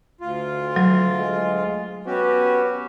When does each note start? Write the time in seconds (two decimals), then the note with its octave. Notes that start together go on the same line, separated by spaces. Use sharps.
0.21 D2 F4
0.76 F#3
1.18 G#3
2.06 B3 C#4 F#4 G4